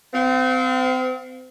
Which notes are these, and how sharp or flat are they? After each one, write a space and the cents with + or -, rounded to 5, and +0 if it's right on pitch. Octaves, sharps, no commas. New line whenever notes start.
C4 -35 F5 +20